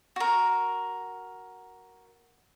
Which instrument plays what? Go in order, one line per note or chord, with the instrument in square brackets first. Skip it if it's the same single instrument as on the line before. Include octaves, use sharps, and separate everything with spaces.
[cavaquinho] F#4 A#4